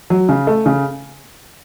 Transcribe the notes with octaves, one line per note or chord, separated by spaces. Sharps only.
F#3
C#3
A3
C#3